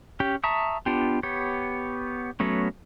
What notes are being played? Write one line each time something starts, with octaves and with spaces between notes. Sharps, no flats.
C#4 G4
E5 A5 A#5 C#6 D#6
B3 D4 F4 G4
B3 G4 C#5
F#3 A3 B3 C#4